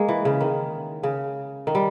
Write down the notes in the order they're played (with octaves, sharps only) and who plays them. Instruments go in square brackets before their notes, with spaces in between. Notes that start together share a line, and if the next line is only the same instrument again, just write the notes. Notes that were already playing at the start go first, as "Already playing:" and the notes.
Already playing: [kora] G#3 A#3
E3
C#3
D#3
C#3
D#3
G3